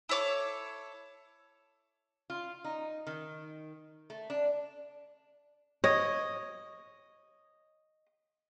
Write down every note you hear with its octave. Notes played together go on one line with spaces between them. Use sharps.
E4 A4 C#5 D6
F4
D#4
D#3
A3
D4
C#5 D#5